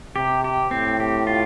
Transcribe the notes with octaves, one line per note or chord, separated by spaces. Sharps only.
C3 G4
G4
A2 C4
G4
F4